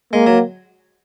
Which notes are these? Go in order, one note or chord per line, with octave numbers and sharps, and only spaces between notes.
G#3 A#3
F#3